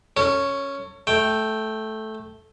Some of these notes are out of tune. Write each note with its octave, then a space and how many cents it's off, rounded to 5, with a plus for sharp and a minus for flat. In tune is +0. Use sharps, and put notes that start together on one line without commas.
C#4 +0 A4 +40
A3 -10 G5 +0